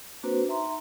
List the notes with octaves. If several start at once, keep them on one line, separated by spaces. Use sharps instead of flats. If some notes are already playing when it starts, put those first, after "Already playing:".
A#3 C4 D4 F#4 B4 C5
D#4 E5 A#5 C6